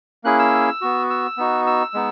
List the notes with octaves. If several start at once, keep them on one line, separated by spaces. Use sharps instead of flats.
A#3 C#4 E4 G#4 F#6
E6
B3 F#4
E6
B3 D#4 F#4
E6
G#3 B3 D#4